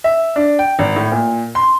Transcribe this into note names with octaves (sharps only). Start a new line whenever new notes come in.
E5
D4
G5
G#1
A2
A#2
C6